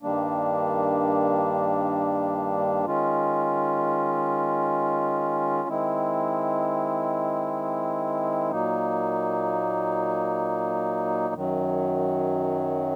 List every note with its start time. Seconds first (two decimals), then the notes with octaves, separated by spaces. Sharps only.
0.03 G2 D#3 G3 A#3 D4
2.86 D#3 G#3 C#4 F4
5.68 D#3 G#3 C4 E4
8.51 A#2 F#3 A#3 D#4
11.35 F#2 D#3 F#3